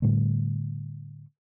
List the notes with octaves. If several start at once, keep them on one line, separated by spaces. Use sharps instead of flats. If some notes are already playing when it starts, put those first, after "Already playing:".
A2 D3 G3 A3